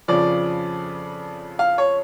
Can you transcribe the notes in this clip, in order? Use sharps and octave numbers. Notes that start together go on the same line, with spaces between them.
F2 C#3 F3 D5
F5
C#5